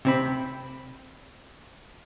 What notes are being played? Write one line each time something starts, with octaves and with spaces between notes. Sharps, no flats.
C3 C4 B5